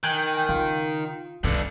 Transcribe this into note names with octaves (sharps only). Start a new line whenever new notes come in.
D#3 G5 G#5 F#6
C#3 F4
G2 D3 A#3 D4